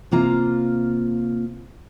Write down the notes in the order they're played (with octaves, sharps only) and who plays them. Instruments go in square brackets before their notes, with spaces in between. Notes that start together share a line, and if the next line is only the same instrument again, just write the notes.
[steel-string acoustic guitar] C3 A#3 F4 A#5